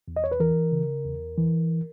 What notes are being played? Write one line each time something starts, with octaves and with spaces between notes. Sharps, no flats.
E2
D#5
C#5
B4
E3 A#4
C#3
E2
E3